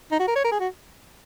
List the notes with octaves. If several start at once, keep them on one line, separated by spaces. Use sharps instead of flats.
D#4
F#4
A#4
C#5
A#4
G#4
F#4